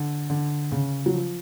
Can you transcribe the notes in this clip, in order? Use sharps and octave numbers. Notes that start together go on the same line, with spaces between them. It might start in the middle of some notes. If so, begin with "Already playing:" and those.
Already playing: D3
D3
C#3
F#3
F3